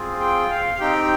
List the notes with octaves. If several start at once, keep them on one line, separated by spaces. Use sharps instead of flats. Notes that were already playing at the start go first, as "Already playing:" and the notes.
Already playing: C4 F4 G#4
G5
F5
F5
C4 D#4 G4 G5